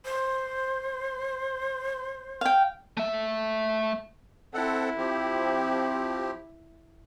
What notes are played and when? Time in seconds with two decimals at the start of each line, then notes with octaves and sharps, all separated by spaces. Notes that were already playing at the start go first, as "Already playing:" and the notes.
0.05 C5
2.41 F5 G5
2.97 A3 E5
4.54 C4 E4 A4 F#5
4.97 F3 C4 G4